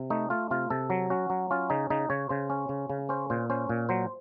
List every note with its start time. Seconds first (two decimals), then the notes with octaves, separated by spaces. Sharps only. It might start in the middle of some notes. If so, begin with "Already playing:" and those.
Already playing: C3
0.10 A3 D#4
0.30 A3 F4
0.51 C3 F4
0.70 C3 A4
0.90 F#3
1.10 C#4 F#4
1.30 F#3
1.51 C#4 F4
1.70 C#3 D#4
1.90 C#3 D#4
2.10 C#3 C#5
2.29 C#3 C5
2.50 C#4
2.69 C#3
2.90 C#3
3.09 C#4 C5
3.30 A#2 C5
3.50 C#4 C5
3.69 A#2
3.89 F#3 C5